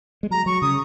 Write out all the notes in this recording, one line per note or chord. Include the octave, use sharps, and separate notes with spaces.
G#3
F#3 A#5
F#3 C#6
C#3 D#6